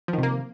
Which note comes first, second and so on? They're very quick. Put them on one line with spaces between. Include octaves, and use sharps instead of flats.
F3 D#3 C3 A#3